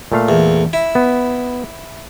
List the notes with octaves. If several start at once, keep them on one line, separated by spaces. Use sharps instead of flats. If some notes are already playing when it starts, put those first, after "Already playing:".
A#2 A3 F5
E2
E4
B3